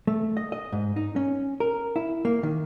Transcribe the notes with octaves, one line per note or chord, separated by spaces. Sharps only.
A3
D#5
D#5
G#2
D#4
C#4
A#4
E4
A#3
D#3